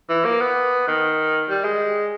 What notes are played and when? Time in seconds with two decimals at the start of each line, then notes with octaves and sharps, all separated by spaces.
0.09 E3
0.25 A#3
0.41 B3
0.87 D#3
1.49 G3
1.64 G#3